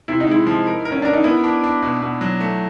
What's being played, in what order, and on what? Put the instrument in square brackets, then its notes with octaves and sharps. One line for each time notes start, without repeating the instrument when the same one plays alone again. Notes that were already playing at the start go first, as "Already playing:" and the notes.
[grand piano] C3 [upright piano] E4
[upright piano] D#4
[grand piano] G#3 [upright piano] E4
[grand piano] F3
A#4
A#4
[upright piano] C#4
[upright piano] D4 [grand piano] A#4
[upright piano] D#4
[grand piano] B3 [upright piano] E4
[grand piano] D4
D4
B2
B2
F#3
A3